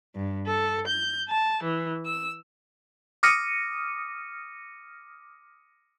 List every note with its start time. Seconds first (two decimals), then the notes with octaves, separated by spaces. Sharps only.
0.16 G2
0.48 A4
0.88 G6
1.29 A5
1.63 E3
2.06 E6
3.23 D6 D#6 F6 A#6 C#7 D#7